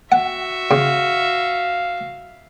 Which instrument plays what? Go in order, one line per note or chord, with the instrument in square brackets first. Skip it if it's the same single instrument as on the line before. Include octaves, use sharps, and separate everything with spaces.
[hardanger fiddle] F#4 E5 [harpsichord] F#5
[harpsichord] C#3 [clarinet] F5